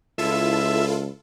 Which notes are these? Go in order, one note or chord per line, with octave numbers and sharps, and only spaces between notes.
C#2 E4 F4 A4 E5